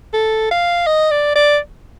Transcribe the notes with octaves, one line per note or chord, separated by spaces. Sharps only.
A4
F5
D#5
D5
D5